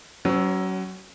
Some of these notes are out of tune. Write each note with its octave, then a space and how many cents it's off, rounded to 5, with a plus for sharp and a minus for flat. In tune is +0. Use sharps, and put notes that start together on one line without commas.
F#3 +25 C#4 +0 C5 -30